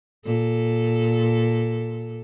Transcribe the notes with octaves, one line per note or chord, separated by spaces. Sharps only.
A#2 A4